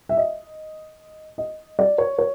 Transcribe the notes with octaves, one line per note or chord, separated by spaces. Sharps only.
E5
D#5
D#5
D5
C#5
C#5